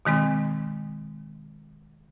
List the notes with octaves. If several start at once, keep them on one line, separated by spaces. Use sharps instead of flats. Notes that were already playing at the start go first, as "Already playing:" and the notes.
B2 D#3 G#3 C4